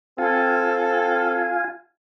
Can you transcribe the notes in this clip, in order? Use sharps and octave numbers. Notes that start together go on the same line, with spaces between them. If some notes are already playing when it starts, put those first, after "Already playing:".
C4 F4 A4 F5 G#5